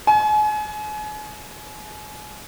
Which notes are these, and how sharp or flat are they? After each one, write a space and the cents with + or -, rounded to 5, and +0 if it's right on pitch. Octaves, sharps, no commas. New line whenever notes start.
G#5 +35